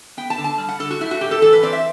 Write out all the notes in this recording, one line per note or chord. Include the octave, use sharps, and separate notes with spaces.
B3 G5
A5
D3
A5
G3
F#5
D3 A4
F#4
A3 E4
F#4
A2 G4
A4
E3 A4
B4
C4 D5
E5